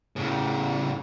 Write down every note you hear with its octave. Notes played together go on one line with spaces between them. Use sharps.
A2 C#3